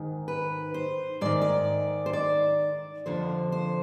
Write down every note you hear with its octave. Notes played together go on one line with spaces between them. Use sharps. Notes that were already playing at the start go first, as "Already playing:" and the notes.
Already playing: G#2 D#3
B4
C5
G#2 D#3 D5
D5
C5
D5
F2 D3 F3 C5
C5